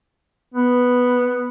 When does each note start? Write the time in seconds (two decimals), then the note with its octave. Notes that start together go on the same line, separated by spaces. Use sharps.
0.54 B3